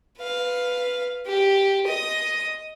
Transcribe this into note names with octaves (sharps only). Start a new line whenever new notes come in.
B4 F5
G4
D#5 D#6